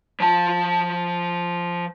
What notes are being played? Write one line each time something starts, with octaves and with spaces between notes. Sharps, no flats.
F3 A5